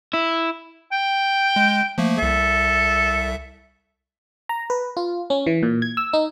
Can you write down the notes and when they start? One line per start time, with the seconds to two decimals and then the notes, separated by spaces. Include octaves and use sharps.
0.14 E4
0.92 G5
1.56 G#3
1.98 F3 A3 A#3
2.18 C2 A4 E5
4.49 A#5
4.70 B4
4.97 F4
5.30 C#4
5.46 E3
5.63 A#2
5.82 G#6
5.97 E6
6.13 D#4